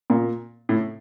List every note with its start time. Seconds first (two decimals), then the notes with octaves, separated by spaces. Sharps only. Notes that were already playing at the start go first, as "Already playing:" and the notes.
0.10 A#2
0.69 A2